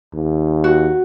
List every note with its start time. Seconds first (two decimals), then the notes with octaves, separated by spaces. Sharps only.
0.14 D#2
0.64 F#4